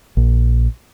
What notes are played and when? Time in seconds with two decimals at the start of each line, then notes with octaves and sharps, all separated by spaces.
0.17 A#1